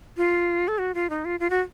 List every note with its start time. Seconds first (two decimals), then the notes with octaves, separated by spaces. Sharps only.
0.17 F4
0.68 A4
0.78 F#4
0.95 F4
1.10 D#4
1.25 F4
1.40 F4
1.50 F#4